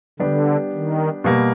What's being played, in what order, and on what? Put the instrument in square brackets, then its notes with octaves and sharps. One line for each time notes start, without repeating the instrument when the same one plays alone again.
[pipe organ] D3 [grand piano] G3 B3 D4 G4
[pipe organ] D#3
[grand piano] B2 G3 A#3